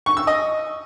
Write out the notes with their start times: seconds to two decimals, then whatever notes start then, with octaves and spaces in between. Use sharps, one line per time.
0.06 C#6
0.17 E6
0.27 D#5